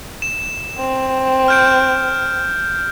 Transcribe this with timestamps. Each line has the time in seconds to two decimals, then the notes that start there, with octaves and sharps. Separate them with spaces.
0.22 E7
0.78 C4
1.48 F6 G6 D7